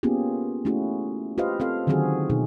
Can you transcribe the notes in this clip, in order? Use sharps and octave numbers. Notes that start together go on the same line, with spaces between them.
A#3 B3 C#4 F4 G4 G#4
A3 C#4 E4 F#4 G#4
F4 G4 B4 C5 D#5 F5
C4 A4 F5
D3 D#3 F#3 C4 F#4 G#4
B2 D#4 G#4